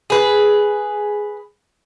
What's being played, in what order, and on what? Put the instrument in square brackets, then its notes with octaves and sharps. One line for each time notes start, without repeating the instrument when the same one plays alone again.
[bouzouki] G#4 B4